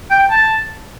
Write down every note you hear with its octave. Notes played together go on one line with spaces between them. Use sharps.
G5
A5